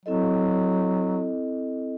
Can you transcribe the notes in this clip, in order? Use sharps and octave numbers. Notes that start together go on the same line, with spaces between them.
F#3 C4 E4 A4 D#5